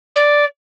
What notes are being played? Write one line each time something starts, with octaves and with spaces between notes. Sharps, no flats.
D5